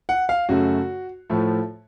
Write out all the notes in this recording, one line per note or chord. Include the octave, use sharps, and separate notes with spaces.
F#5
F5
F#2 C#3 A3 F#4
A2 F3 A3